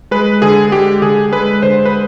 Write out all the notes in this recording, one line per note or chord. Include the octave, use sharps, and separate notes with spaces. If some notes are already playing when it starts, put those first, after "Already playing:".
G#3 B4
D3 G#4
G#3 G4
D3 G#4
G#3 B4
D3 C5
B4